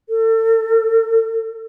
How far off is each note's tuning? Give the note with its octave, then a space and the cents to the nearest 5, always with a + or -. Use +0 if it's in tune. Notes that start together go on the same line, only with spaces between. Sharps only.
A4 +35